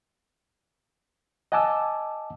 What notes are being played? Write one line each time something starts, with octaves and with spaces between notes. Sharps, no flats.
D#5 F#5 G#5 A5 D6 E6